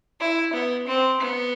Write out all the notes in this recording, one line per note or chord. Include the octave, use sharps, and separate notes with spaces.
E4
B3
C4
B3